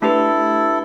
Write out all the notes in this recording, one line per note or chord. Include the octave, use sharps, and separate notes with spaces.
A3 D4 E4 G4 A4 B4